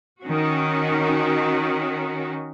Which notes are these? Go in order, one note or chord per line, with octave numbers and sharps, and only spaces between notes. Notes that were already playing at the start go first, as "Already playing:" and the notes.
D#3 C#4 F#4